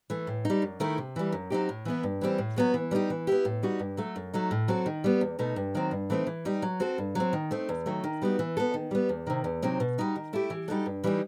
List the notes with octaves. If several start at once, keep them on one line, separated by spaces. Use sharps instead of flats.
E3 A3
A2
G3 D#4
F#2
D#3 A3 E4
C3
E3 G3
F#2
F#3 C4 D#4 G4
A2
E3 B3 E4
G2
E3 G3 C4
A2
F#3 B3 F#4
E3
G3 B3 D#4 G4
E3
B3 E4 G4
A2
G3 D#4 F#4
G2
F#3 A3
F#2
F#3 A3 D#4
A2
F#3 C4 F#4 A4
D#3
G3 B3
E2
B2 A3 D#4
G2
D#3 F#3 C4
G2
E3 A3 C4 D#4
E3
G3 D#4 G4
F#3
C4 F#4 A4
G2
F#3 C4
D#3
A3 C4 D#4
E2
D#3 F#3 A3
D#3
G3 B3 D#4 F#4
E3
B3 F#4 A4
D#3
G3 B3
E2
C3 D#3
E2
C3 F#3 C4 D#4
B2
G3 D#4 F#4
D#3
A3 E4 G4
E3
G3 D#4 F#4 A4
G2
E3 G3 B3 D#4